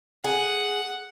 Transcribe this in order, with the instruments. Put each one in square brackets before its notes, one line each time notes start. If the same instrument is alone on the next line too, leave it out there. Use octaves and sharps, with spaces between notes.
[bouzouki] G#4 [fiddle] F#5